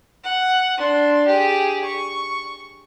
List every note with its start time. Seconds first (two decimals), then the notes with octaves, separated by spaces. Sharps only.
0.24 F#5
0.77 D4 C6
1.27 G4 G#4
1.84 C#6